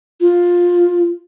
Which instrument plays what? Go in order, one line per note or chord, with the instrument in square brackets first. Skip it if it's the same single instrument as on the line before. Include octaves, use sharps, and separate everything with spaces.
[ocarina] F4